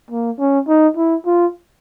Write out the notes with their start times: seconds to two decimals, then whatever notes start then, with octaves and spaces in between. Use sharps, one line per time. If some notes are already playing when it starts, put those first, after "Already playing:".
0.10 A#3
0.39 C#4
0.68 D#4
0.97 E4
1.26 F4